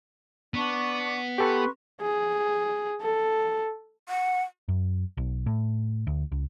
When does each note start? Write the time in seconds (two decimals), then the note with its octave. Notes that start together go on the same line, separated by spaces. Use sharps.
0.54 B3 D4 C#6
1.38 G4 A4 B4 C6 C#6
2.01 G#4
3.02 A4
4.09 F#5
4.68 F#2
5.17 B1
5.46 A2
6.07 D2
6.32 C#2